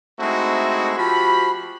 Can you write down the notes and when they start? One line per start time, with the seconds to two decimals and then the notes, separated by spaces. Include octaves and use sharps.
0.20 G#3 A3 C4 D#4 E4 F#4
0.98 F3 F#4 G4 B5